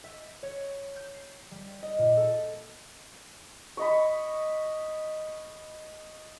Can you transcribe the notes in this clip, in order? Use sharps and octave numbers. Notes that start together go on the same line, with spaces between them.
E5
C#5
G6
C7
G3
D#5
A#2
A4
C#5 D#5 B5